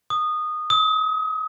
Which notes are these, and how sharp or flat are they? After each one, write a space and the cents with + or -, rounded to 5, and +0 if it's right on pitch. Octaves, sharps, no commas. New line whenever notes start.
D#6 -15
D#6 +35